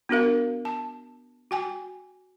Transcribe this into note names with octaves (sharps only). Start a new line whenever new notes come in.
B3 D4 F#4 A#4 F5
A5
F#4 G5 G#5